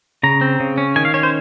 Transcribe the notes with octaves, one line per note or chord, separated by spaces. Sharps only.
C#3 A#5
C4
C#3
C#4
D#3 G#5
F5
C#4 C#5
C5